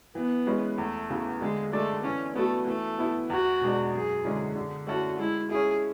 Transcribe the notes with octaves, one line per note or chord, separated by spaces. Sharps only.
E3 B3
G#3 C#4 E4 B4
E2 A3
C#3 E3 B3
D3 G#3
G#3 A3 D4 A4 D5
E3 C#4
A3 B3 F#4 A4
E3 A3
B3 E4 A4
E2 F#4
B2 G#3 D4
F#2 G#4
D3 G#3 C#4 E4
D3
A3 C#4 E4 F#4 A4
G#3 E4
C#4 E4 G#4